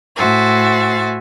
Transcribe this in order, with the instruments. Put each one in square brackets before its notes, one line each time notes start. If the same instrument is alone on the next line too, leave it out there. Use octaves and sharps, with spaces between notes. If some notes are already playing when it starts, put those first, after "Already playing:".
[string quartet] A2 F#4 C5 E5 G#5 A6